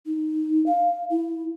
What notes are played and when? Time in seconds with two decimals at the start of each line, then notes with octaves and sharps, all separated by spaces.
0.06 D#4
0.66 F5
1.10 E4